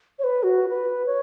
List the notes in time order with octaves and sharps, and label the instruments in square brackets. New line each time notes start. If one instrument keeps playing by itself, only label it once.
[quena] C#5
B4
F#4
B4
C#5